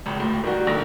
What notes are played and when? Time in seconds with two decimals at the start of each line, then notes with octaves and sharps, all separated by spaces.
0.06 G#1 C#2
0.17 D1 A2
0.44 D#3 G3 F#4
0.67 A#1 D3 A#4 A#6